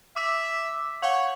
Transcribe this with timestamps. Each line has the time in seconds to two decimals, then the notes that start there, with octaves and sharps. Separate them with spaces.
0.16 E5 D6 E6 B6
1.02 C#5 F5 F#5